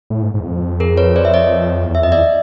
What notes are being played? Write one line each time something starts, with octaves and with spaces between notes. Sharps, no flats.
A2
G#2
G#2
E2
F2
G#4 A#4
B4 C#5
C5 D5
E5
C#5 D#5
E2
E5
F2 D#5
E2 D5 E5